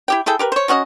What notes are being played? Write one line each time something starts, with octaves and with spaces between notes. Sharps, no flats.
E4 G4 G5
E4 G#4 A4 G5
G4 A#4 B4
C5 C#5
F#3 C#4 F#4 D#5